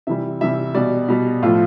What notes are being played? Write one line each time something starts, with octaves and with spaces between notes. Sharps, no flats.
C3 E3 G3 E5
C3 E3 G3 E5
B2 G3 D5
B2 G3
A2 F3 F4